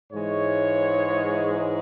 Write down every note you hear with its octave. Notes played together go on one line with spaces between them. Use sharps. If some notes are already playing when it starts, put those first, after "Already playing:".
G#2 E3 G#3 C#5